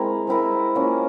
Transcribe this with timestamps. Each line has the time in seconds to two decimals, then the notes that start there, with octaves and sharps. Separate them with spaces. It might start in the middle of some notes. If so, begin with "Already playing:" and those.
Already playing: G#3 C4 E4 A#4
0.27 G#3 C4 E4 A#4
0.75 A#3 C#4 F4